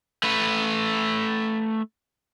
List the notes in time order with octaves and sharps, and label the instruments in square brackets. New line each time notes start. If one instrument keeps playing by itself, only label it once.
[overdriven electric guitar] A3 B4